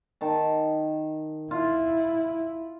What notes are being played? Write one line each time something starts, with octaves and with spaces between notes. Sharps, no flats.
D#3 A5
E4 F4